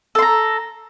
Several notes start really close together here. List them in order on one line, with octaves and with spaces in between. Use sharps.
A4 C6 A#5